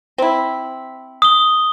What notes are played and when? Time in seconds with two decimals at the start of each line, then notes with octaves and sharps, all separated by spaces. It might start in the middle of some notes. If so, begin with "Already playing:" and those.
0.18 C4 E4
1.22 D#6 G7